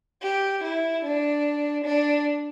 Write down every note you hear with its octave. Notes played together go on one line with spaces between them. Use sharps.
G4
E4
D4
D4